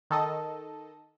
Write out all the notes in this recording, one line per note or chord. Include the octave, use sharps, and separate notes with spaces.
D#3 A4 D#5